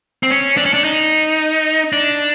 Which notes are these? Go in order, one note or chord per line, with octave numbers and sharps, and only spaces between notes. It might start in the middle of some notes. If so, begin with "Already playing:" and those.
C4
C#4
D4
C#4
D4
D#4
D4